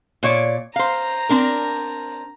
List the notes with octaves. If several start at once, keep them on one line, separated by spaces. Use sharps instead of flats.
A#2 C#5 D5
C5 F5 A#5
C4 D4 A#4